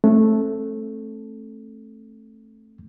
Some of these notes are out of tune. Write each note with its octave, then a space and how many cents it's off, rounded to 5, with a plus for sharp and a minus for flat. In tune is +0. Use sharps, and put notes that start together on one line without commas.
A3 +0 C4 +45